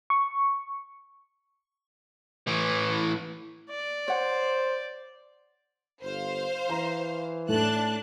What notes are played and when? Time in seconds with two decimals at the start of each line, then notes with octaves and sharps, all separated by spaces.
0.10 C#6
2.47 A2 E3
3.70 D5
4.08 C5 C#5 F#5
6.03 G1 C5 F5
6.69 E3 A#5
7.48 A2 A3 D4 A5 F#6